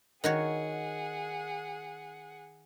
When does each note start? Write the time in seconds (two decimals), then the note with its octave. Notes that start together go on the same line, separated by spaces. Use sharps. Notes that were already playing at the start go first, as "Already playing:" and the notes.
0.24 D#3 F#4 G#4 C#5 F#5